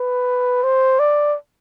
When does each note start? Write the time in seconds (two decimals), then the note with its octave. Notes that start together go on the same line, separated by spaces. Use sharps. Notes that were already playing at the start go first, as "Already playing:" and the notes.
Already playing: B4
0.63 C5
0.99 D5